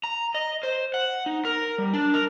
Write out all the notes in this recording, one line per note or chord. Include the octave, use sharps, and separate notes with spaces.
A#5
D#5
C5
F#5
D#4
A#4
G3
D4
A#4